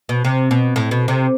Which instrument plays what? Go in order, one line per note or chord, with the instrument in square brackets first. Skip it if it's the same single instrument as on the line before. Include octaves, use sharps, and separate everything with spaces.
[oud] B2
C3
B2
A2
B2
C3